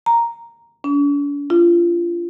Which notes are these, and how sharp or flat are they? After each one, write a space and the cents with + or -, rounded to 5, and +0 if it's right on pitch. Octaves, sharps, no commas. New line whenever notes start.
A#5 +0
D4 -45
F4 -25